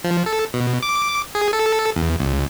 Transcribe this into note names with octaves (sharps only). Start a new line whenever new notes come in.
F3
A4
B2
D6
G#4
A4
E2
C#2